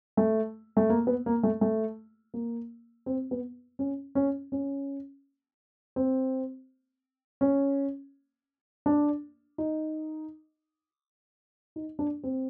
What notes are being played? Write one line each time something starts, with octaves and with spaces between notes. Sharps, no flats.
A3
A3
A#3
B3
A#3
A3
A3
A#3
C4
B3
C#4
C#4
C#4
C4
C#4
D4
D#4
D#4
D4
C4